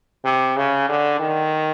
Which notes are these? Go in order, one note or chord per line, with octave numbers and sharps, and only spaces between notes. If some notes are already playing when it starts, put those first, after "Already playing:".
C3
C#3
D3
D#3